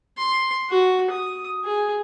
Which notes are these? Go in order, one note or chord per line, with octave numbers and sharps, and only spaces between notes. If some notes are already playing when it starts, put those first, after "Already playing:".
C6
F#4
D#6
G#4